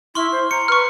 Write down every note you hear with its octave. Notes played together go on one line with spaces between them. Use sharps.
E4 C6 C#6 F6
C5
A#5 C#7
B4 C#6 F6